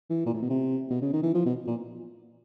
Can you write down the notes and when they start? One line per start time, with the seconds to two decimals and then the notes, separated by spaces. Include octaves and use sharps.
0.10 E3
0.26 A#2
0.34 A2
0.42 B2
0.50 C3
0.90 B2
1.02 C#3
1.13 D#3
1.23 E3
1.35 F3
1.46 B2
1.67 A#2